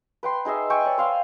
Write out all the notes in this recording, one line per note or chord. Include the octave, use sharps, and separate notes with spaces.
B4 G5 C6
D#4 G#4 D#5 E5
G5 G#5 C#6 E6
C#5 D5
C5 F5 C6